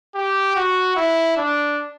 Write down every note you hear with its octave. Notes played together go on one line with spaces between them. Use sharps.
G4
F#4
E4
D4